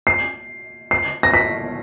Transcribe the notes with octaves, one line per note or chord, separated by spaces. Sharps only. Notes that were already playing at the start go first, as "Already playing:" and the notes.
C7
C7
A#6
B6